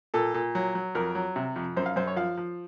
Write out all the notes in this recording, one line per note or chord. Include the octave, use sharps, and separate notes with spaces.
A#2 A4
A#2
F#3
F#3
F2 A#4
F#3
C3
F2
F#2 C5
F5
F#2 C5
C#5
F3 F5
F3